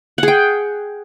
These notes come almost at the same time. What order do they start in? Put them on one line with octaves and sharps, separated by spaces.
F#5 G#4 G5